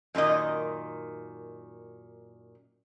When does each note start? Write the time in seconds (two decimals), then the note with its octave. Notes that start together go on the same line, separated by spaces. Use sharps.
0.15 F#2 A#2 D#3 D#5